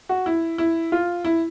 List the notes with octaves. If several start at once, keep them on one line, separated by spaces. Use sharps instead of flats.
F#4
E4
E4
F4
E4